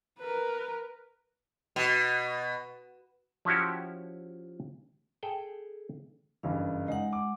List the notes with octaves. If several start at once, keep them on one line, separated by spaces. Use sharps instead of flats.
A#4 B4
B2
F3 C#4 E4 F#4 G4
G#4 A4 G5
F#1 G2 E3 F5
G#3 D#4 F#5
D6